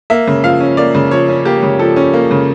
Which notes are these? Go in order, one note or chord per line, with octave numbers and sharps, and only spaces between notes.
A#3 E5
C#3
F3 F5
C#4
A#3 D5
C#3
F3 C#5
C#4
A#3 G4
C#3
F3 A4
C#4
A#3
C#3